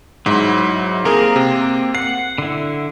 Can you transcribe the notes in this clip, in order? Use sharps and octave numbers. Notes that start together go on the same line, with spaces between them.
G#2 F#3 E4
A#3 C4 G4 G#4 A#4 A#5
C3
F#5 C7
D3 E4